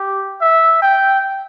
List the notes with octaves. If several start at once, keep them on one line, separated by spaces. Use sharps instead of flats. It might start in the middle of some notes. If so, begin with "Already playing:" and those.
Already playing: G4
E5
G5